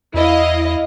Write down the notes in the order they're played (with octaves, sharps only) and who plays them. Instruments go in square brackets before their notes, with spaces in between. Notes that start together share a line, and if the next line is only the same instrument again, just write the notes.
[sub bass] E2 [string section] E4 D#5 F5